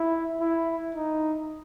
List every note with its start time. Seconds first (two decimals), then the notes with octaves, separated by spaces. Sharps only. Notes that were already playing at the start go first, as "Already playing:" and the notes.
Already playing: E4
0.41 E4
0.95 D#4